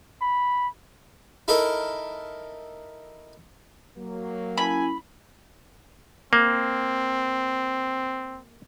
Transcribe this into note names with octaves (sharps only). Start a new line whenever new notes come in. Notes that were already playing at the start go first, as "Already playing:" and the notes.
B5
D#4 E4 A4 A#4
F#3 A#3
C#4 E4 G#5 B5
A#3 C4